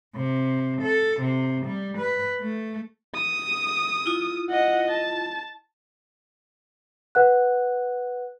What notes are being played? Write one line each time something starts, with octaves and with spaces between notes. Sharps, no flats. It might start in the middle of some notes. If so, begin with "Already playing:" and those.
C3
A4
C3
G3
B4
A3
D#6
E4 F4
D#5 F#5
A5
B4 F#5 F#6